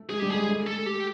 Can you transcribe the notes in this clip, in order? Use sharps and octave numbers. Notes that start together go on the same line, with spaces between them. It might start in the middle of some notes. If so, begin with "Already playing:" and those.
Already playing: A3
G#3 G#4
G3 G4
G#3 G#4
A3
A4
G4